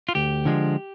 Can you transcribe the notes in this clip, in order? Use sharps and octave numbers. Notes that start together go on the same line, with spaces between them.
F4
D2 G4
D3 F3 G#3